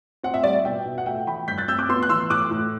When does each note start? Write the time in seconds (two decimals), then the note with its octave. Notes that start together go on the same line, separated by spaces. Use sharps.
0.23 C4 F#5
0.34 E5
0.44 G3 D5
0.54 E5
0.65 B2 E5 G5
0.86 B2
0.98 F#5
1.06 A3 E5 G5
1.27 E3 G5 B5
1.48 G2 G6 B6
1.58 F#6 A6
1.68 C4 E6 G6
1.79 D6 F#6
1.89 B3 C6 E6
2.03 F#6
2.09 E3 C6 E6
2.30 A2 D6 F#6
2.51 A2